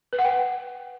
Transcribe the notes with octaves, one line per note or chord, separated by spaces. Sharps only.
B4
F#5
G5